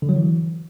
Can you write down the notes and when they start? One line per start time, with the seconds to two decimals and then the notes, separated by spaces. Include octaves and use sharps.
0.02 D3
0.09 F#3
0.16 E3